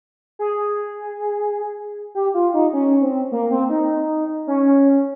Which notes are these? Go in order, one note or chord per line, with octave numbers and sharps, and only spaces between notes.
G#4
G4
F4
D#4
C#4
C4
A#3
C4
D#4
C#4